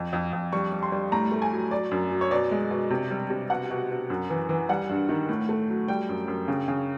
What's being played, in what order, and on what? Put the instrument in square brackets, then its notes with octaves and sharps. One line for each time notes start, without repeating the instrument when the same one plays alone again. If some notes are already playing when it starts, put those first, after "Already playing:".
Already playing: [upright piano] F2
F2
F2
G3 C#6
G3
C6
G3
A2 A#5
A3
G#5
F#3
F#3 D5
F#2
F#3
C#5
B2 D5
G#3
B2
C3
G3
C3
B2 F#5
B2
B2
F#2
E3
E3
G3 F#5
G2
D#3
A2
A3
F#3
G3 G5
F#2
F#2
C#3
C#3